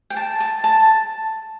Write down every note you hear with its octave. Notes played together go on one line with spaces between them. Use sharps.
G5
A5
A5
A5